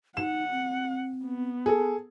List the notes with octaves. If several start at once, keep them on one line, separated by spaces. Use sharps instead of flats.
D#4 F#5 E7
C4
B3
G#4 A4